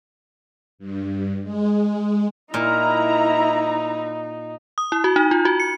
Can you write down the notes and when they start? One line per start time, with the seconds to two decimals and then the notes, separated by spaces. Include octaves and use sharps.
0.79 G2
1.43 G#3
2.54 A#2 D#4 E4 A#5
4.78 D#6
4.92 E4
5.04 F#4
5.16 D#4
5.31 F4
5.45 F#4
5.60 C#7